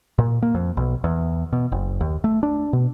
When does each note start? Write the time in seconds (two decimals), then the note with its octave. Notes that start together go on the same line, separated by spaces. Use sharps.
0.19 A#2
0.42 A#3
0.55 F2
0.77 B1
1.04 E2
1.53 B2
1.72 F#1
2.01 D#2
2.24 A3
2.43 D4
2.73 B2